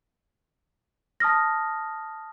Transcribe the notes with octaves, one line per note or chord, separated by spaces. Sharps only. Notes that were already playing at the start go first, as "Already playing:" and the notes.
A5 D#6 F6 A#6